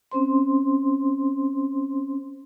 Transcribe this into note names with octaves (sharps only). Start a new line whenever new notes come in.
C4 C#4 C5 C6